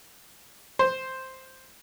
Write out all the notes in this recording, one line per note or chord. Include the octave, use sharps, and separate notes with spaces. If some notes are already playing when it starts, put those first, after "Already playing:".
C5